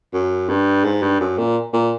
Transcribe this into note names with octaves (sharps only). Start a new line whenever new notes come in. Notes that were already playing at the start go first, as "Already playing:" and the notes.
F#2
G2
G#2
G2
F#2
A#2
A#2